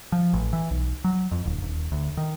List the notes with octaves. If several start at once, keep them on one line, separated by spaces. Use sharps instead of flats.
F3
A1
E3
B1
F#3
F2
D1
D#1
D2
D#3